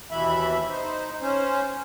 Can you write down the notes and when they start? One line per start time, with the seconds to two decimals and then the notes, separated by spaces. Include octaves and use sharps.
0.11 D#2 B2 E3 E5 B5
0.70 D#4 C5
1.22 C#4 C5